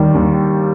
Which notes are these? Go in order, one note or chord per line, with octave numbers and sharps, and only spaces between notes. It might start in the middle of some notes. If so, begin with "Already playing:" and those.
Already playing: D#2 D#3 G3
D#2